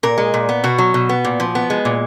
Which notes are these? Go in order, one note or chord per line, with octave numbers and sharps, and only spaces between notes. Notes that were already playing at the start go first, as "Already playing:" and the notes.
A#2 A#4
G#3
A#2
B3
B2 F#4
F#3
B2
B3
A#2
F3
B3
G#3
A#2